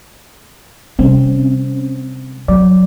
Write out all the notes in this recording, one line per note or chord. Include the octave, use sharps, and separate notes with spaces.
C3 G3 C4 C#4
F#3 D5